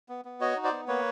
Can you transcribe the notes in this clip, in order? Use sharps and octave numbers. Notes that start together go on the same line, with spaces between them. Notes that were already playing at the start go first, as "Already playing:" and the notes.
B3
B3
F#4 C#5 D#5
D#4
C5 D5
B3
A#3 B4 C#5